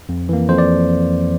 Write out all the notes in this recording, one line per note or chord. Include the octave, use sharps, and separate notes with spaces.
F2
E3 A#3
F2 C5
D5